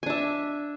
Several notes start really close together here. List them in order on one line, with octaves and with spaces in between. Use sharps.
G#5 D4 E5